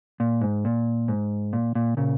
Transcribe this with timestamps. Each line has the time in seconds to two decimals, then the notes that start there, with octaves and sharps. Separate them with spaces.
0.20 A#2
0.41 G#2
0.65 A#2
1.08 G#2
1.53 A#2
1.75 A#2
1.97 A#2 C#3